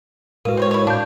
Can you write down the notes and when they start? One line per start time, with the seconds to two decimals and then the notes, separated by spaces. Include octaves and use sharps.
0.45 A2 G#3 A#3 F#4 A#4 B4
0.57 C4 C5 C#5
0.71 E4 C#5
0.87 D4 F5 G6